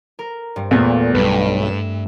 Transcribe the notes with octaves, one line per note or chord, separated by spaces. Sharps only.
A#4
G2 C4
E2 A#2 A3 G#5
B1 G2 B4
E5 E7